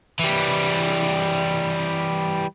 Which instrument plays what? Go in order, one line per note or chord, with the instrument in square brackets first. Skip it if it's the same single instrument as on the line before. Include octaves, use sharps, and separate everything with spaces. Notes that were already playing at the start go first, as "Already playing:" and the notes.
[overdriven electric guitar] E3 G3